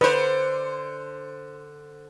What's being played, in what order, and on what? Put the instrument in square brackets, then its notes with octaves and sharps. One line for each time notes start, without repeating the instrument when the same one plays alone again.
[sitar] D3 C5 [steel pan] B4